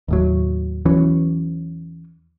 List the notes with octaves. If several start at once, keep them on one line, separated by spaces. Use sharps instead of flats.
D#2 A2 F#3
E2 E3 F#3 C#4